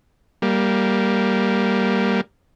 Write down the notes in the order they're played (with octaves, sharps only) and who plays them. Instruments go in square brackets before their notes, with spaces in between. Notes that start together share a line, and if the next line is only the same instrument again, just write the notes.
[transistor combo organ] G3 A#3